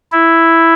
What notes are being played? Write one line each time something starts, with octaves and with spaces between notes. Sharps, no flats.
E4